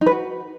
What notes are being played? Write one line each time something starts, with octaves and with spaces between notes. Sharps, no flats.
D#4
B4
F#4